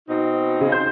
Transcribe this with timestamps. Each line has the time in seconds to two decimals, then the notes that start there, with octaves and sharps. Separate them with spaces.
0.08 B2 C4 D#4
0.61 C#3
0.72 C5 G6